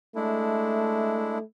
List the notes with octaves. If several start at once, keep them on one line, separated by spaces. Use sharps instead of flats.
G#3 A3 D4 E4